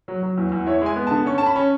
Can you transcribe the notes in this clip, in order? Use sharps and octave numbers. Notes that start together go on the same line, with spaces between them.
F#3
F#3
E2
E2
E4 C#5
G#3 G#5
B3
A5
D3
C#4 C#6
C#4 A5
B5
C#4